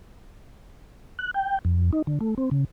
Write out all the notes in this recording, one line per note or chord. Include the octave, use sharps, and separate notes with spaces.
F#6
G5
F2
D#4
D3
A3
C4
C#3